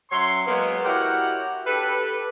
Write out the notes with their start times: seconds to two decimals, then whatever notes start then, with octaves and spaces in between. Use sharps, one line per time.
0.11 F#3 C#4 C#5 E5 C6
0.47 F#3 G#3 A#3 B3
0.85 E4 F#4 G4 A#4 C#5 F#5
1.67 D4 G4 A4 B4